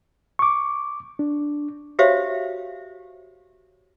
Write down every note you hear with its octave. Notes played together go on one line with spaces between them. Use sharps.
C#6 D6
D4
F#4 G4 C5 C#5 E5 F5